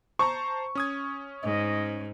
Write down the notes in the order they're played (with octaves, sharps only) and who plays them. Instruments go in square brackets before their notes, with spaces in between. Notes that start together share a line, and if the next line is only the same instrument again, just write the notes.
[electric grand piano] C5 A5 A#5 [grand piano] C#6
[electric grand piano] C#4 D#6 G#6
[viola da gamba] G#2 [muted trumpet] D#5